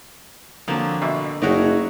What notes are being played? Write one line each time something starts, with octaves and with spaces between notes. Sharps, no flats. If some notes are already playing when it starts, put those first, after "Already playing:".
D3 F3 F#3 A#3 C4
A1 B2 E5
F#1 A3 D#4 F#4 G#4 A#4 C#5